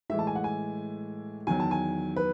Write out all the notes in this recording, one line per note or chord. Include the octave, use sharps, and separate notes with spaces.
A2 E3 G#3 E5
A5
G#5
F#5
G#5
E2 D#3 F#3 G#5
A5
G#5
B4